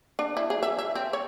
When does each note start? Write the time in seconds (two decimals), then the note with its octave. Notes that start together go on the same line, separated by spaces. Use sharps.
0.19 D4
0.37 E4
0.50 G#4
0.63 E5
0.79 E5
0.95 C4
1.13 C#5